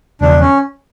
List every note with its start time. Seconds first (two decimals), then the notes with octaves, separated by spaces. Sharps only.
0.21 E1 E2 C#3 F3 D4
0.40 C#4